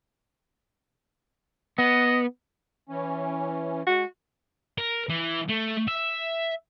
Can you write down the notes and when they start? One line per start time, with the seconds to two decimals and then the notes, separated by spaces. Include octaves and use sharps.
1.78 B3 D#5
2.89 E3 C#4
3.87 G#3 F#4
4.78 A#4
5.09 E3
5.48 A3
5.87 E5